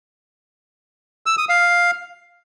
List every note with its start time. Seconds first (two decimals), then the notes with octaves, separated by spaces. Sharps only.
1.26 E6
1.38 D#6
1.49 F5